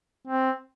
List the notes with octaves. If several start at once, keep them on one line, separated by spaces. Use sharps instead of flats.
C4